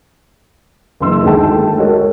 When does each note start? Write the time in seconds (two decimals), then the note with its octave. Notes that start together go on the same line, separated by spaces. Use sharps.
1.00 F#1 E3 C6 E6
1.23 D2 D#3 G#3 A3 G5 A5
1.77 G#3 F#4 A#4 C#5